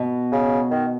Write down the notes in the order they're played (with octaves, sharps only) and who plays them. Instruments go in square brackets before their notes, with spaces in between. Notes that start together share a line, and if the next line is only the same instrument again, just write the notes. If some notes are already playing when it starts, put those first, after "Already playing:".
Already playing: [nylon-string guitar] B2
[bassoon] C#3
D#3